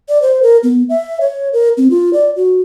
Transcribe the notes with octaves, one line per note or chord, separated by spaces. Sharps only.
D5
C5
A#4
B3
E5
C#5
A#4
C4
F4
D5
F#4